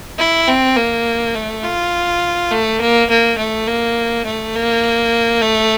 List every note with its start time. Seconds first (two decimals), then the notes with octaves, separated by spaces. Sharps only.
0.18 E4
0.47 C4
0.76 A#3
1.35 A3
1.64 F4
2.51 A3
2.79 A#3
3.10 A#3
3.38 A3
3.67 A#3
4.25 A3
4.55 A#3
5.42 A3